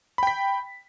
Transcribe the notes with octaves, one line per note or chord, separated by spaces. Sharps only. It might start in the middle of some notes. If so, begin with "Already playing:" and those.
G5 B5 B6